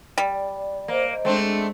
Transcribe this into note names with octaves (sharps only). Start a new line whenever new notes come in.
G3 D5
A#3 C5 D#5
G#3 A3 C4 D4